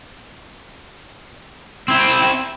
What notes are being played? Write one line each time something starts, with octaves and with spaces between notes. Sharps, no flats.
C4 E4